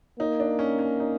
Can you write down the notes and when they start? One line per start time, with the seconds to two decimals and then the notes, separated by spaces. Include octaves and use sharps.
0.19 A#3 D#4
0.40 D4
0.59 C#4
0.79 C#4
1.00 D#4